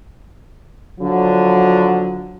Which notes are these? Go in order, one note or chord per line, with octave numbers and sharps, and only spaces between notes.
D3 F3 F#3